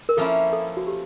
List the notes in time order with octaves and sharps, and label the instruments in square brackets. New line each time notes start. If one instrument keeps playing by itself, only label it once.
[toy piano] A#4
[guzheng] F3 A#3 C#4 E4 [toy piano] A4
[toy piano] A4
F#4
G4